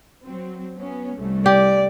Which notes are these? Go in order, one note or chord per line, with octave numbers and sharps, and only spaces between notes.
F#3 C4
F#3 B3 C#4
C2 A3
G4 D5